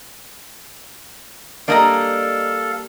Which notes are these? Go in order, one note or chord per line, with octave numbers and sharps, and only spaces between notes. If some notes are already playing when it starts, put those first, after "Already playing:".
G3 A#3 D4 A4 D5 D#5 F5 A#5